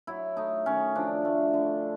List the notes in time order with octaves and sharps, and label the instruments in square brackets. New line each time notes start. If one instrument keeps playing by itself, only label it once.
[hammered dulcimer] F#3 E4
A3 D#4
D#3 C#4
F3 D4
A3
D3